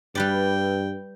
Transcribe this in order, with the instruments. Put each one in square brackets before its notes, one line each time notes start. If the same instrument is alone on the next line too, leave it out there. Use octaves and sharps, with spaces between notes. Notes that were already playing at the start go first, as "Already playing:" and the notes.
[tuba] G2 [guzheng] G3 B4 D5 [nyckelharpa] G5